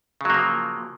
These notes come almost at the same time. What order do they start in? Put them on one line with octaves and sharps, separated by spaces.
C#3 F#3 A#3 F3